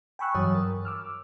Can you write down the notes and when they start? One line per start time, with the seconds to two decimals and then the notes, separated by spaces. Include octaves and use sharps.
0.19 G5 G#5 B5 C#6 E6 F#6
0.34 G2 E3 F#3 C#5 D#6
0.54 A#4
0.85 D6 E6 F6